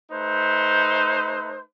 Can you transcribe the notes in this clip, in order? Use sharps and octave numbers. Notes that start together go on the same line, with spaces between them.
A3 D#4 B4 C5